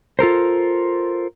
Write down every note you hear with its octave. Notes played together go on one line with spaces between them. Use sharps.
F4 A4 A#4 C5